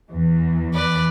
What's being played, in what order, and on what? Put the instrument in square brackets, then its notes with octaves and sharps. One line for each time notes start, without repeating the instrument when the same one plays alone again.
[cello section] E2 E3
[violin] B4 D5